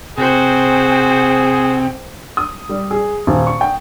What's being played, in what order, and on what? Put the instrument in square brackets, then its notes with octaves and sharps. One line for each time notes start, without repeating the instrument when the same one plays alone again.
[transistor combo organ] C3 [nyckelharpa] F#4 C5 [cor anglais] G#4 [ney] G5
[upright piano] D#6
G3
G#4
D#1
C#6
G5